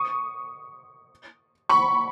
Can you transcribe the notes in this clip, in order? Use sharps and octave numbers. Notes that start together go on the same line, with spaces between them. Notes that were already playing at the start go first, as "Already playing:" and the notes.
Already playing: C#6 D#6
B5 C#6